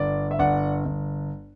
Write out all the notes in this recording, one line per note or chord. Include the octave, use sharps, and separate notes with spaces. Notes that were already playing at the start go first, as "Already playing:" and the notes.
Already playing: G1 D5
E5
G1 D5 F#5
G1